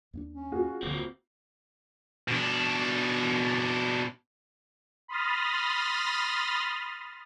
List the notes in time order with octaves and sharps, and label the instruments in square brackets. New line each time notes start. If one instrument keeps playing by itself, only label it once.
[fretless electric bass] D#2 A#3 D4
[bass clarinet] C#4
[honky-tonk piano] F4 F#4 G#4
[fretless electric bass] D1 D3 [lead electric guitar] A#3 C4
[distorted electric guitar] B2 D4
[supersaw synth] B5 C6 D#6 F6 A6 A#6